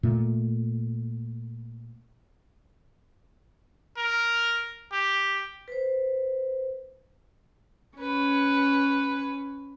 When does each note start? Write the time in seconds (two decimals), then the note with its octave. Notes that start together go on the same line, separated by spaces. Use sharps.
0.03 A#2 A3
3.97 A#4
4.92 G4
5.68 B4 C5
7.97 C#4 B4